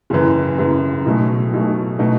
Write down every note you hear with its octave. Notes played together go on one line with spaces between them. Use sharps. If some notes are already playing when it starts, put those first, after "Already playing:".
F#1 F#2 E3
F#1 F#2 E3
B1 B2 F#3 A3
B1 B2 F#3 A3
B2 A3 D#4 F#4